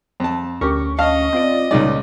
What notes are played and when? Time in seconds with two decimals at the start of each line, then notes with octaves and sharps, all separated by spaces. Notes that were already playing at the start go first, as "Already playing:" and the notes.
0.20 F2 A5
0.61 D2 C#4 G4 A#4 C#6
0.99 D#5 F5 A5 F6
1.33 C4 F4 D5
1.71 C#2 A#2 G#3 D#4 D5